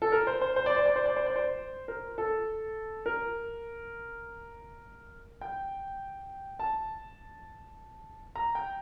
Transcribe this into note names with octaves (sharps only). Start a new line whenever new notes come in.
A4
A#4
C5
C5
C5
D5
C5
D5
C5
D5
C5
D5
C5
A#4
A4
A#4
G5
A5
A#5
G5